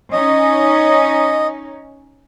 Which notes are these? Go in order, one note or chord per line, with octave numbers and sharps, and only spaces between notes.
C#4 D#4 D#5